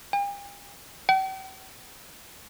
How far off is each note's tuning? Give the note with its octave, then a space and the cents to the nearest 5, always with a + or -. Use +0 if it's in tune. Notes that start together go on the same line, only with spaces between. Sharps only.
G5 +45
G5 -45